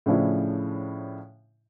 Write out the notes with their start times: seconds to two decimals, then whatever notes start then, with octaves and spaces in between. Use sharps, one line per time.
0.06 A2 C#3 F3 D4 E4